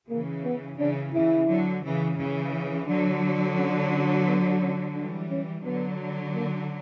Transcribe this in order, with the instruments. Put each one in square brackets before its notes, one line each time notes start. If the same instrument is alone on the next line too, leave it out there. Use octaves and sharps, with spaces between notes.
[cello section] C#3 E3 [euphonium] A#3
[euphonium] B3
[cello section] C#3 E3 [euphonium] D4
[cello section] C#3 E3 [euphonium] E4
[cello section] D3 F#3
C#3 E3
C#3 E3
[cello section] D3 F#3 [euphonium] D4
[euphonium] C#4
C#4
B3
C#4
[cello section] E3 G3 [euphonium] D4
[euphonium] C#4
[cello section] D3 F#3 [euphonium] B3
[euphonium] A#3